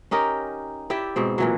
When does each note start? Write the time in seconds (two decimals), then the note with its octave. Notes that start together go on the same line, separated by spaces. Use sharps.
0.11 C#4 D#4 G4 A#4
0.90 E4 G4 D5 E5
1.16 G#2 B2 C4
1.38 A#2 E3 F#3